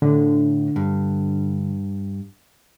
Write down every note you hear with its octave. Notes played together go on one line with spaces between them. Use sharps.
A2 D3
G2